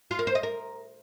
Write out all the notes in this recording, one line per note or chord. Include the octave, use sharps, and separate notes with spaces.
F4
A#4
C5
D#5
A#4